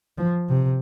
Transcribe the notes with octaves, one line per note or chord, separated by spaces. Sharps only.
F3
C3